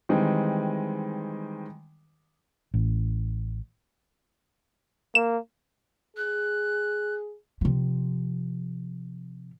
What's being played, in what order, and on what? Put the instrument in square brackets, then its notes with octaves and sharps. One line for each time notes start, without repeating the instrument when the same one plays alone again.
[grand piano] D#3 E3 G3 G#3 C4 D#4
[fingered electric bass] A1
[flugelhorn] A#3 [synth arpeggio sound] E7
[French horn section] G#4 [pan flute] F#6
[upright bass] C3 F3